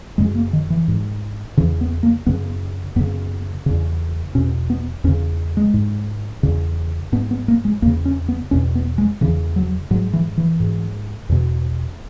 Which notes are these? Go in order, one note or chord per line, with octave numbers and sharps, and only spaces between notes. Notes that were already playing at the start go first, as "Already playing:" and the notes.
F#2 C#3 G#3
A#3
D#3
E3
G#2
E2 C#3 E3
B3
A#3
F#2 C#3 B3
F#2 C#3 B3
E2 C#3
E2 B2 C#4
B3
E2 C#3 C#4
G#3
G#2
E2 C#3
G#2 B3
B3
A#3
G#3
E2 C#3 A#3
C#4
B3
E2 B2 C#4
B3
G#3
E2 C#3 E3
F#3
G#2 F#3
E3
E3
G#2
E2 B2